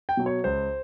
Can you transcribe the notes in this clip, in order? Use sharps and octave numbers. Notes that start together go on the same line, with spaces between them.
G5
B2 F#3
C#5
C#2 C5